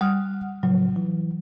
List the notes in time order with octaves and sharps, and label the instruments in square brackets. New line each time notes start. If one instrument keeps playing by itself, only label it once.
[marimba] G3 D#6 [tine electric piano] F#5 F6
[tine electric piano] A2 C#3 F3 [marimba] F#3
[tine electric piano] E3